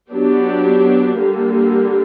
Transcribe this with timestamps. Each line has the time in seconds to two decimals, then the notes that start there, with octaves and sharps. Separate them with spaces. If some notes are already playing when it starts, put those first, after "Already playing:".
0.11 F#3 B3 D4 G4
1.18 D3 G3 A#3